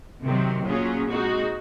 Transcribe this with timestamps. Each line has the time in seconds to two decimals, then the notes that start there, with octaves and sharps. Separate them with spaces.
0.24 C3 D#3 F#3 C4
0.66 A#2 F#3 C#4 F4 G#4
1.08 G#3 C4 D#4 F#4